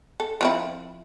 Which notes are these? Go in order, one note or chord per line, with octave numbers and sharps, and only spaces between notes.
A4
F3 C4 E4